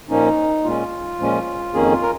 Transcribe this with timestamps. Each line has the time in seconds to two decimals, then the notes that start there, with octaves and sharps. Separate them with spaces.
0.10 A#2 F3 A#3 C#4 D#4
0.64 A#2 G#3 C#4 F4
1.19 A#2 F3 G#3 C#4
1.74 F2 D#3 A#3 C#4 G#4
1.92 F4
2.02 A#4